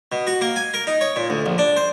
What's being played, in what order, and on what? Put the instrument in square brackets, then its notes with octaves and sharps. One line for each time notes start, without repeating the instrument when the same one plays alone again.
[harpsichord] B2
F#4
A#3
G#5
A#4
D#4
C#5
A#2
D2
A#1
D4
C5